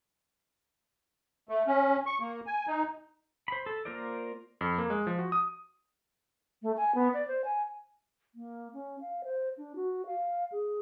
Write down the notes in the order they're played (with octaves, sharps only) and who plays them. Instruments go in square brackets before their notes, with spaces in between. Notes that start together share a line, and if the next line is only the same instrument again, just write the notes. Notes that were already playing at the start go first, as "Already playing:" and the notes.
[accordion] A3
C#4
C#6
A#3
G#5
D#4
[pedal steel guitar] C5 B5
A4
A#3 F4 A#4 C5 D5
[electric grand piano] F2
A#3
G#3
F3
F#4
D#6
[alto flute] A3
G#5
B3
D5
C5
G#5
A#3
C#4
F5
C5
D4
F#4
F5
G#4